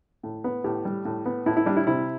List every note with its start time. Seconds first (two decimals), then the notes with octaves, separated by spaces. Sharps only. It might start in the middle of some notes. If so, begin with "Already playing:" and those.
0.23 A2
0.44 B3
0.64 A2 G4
0.85 G3
1.05 A2
1.26 B3
1.46 A2 E4
1.57 E4
1.66 G3 D4
1.76 E4
1.87 C3 E4